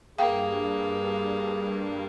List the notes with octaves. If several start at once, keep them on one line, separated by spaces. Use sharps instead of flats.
G2 A#3 G#4 F5 G5